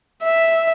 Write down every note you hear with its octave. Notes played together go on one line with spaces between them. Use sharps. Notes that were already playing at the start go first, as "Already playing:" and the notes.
E5